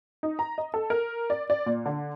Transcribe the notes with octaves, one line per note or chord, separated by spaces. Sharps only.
D#4
A#5
D#5
A4
A#4
D5
D5
A#2
D3